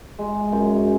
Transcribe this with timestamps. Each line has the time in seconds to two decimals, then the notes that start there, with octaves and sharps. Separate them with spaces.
0.19 G#3
0.52 F#2